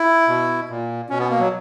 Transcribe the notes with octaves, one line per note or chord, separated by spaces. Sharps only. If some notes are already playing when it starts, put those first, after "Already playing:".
Already playing: E4
B2
A#2
B2 C#4
B3
A#3
F#3